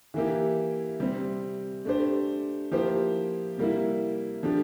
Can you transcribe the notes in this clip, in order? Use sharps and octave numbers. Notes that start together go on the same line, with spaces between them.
E3 A#3 E4 G4
C3 G3 C4
A3 D4 G4 C5
F3 A#3 E4 G4 C5
C3 G3 A#3 E4
F3 A3 D4 G4